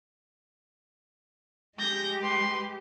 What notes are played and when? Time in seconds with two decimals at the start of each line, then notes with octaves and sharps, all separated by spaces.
1.78 G#3 G4 G6 A#6
2.21 B4 C6